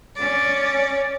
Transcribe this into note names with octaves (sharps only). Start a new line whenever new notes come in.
C#4 D5